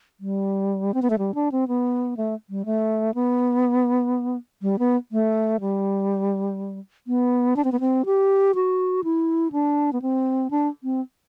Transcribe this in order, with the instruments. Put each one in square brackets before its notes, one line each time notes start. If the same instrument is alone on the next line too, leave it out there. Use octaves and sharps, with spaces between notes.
[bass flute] G3
C4
B3
A3
G3
D4
C4
B3
A3
G3
A3
B3
G3
B3
A3
G3
B3
D4
C4
B3
C4
G4
F#4
E4
D4
B3
C4
D4
C4